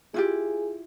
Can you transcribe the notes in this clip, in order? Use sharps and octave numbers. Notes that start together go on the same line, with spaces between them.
E4 F4 G4 G#4